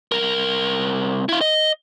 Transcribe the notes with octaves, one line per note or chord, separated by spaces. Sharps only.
C2 A#4
E4 F5
D#5